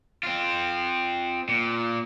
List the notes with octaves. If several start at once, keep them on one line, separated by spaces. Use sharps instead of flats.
C4 F4
A#2